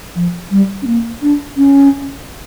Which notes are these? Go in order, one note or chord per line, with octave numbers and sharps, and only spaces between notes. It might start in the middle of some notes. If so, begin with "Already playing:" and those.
F3
G3
C#4
A#3
D4
C#4